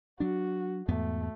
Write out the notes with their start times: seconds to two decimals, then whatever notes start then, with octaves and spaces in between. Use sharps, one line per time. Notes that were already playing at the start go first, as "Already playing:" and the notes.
0.20 F#3 D4 F#4
0.88 E2 G#2 A3 B3